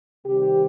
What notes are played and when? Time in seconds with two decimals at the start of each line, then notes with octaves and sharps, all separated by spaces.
0.25 C3 D#3 G3 C4 G4